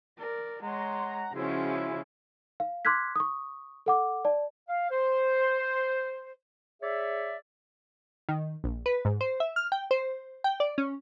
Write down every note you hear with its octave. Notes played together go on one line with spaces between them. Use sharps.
A#4 D5
G#3 C#5 F#5 A#5 C6
C#3 F3 G#3 C#4 E4 F#4 G#4 C5
F5
C6 D6 F6 F#6 G#6 B6
C#6 D#6
A4 F#5 D6
D5 A5
F5
C5
G#4 C#5 D5 E5
D#3
A#1
B4
G#2
C5
E5
F6
G5
C5
G5
D5
C#4